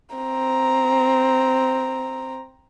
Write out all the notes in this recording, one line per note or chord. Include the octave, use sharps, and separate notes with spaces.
C4 A#5